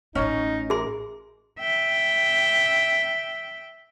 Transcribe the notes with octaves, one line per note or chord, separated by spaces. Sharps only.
A1 A2 C#4 D#4
G#4 A#4 C6
E5 G5